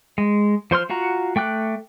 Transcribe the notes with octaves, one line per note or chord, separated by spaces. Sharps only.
G#3
F3 C5 C6 F6
F4 F#4 F#5 A#5
A3 G5 D6 F#6